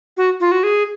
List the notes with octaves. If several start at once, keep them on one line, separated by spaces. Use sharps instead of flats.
F#4
F4
F#4
G#4